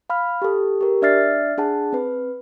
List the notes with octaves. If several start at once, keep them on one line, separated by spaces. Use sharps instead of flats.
F5 B5 F6
G4 A4
G4 A#4
D4 D5 E5 F6 A6 C7
D4 G#4 F#5 A5
C4 B4